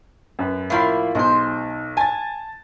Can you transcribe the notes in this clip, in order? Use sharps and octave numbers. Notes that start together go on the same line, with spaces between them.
F#2 B4
A2 F3 A#3 E4 F4 B5
B1 G#3 D#4 C5
G#5 A5 A6